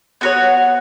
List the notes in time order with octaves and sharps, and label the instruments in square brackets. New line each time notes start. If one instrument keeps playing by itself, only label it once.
[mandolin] B3 F#4 C#5